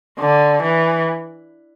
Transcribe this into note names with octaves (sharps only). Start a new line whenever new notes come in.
D3
E3